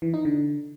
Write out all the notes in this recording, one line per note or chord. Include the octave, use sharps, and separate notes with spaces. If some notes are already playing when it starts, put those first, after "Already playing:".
E3
D#4
D3